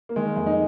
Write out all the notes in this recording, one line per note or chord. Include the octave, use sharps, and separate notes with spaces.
A#3
D#3 G#3
A#3
F2 G#3
D#4